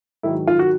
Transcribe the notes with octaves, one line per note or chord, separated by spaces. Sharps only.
G#2 D#3 F#3 E4
F4
F#4